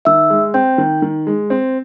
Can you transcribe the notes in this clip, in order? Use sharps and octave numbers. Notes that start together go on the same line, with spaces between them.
D#3 E5 E6
G#3
C4 G5 G6
D#3
D#3
G#3
C4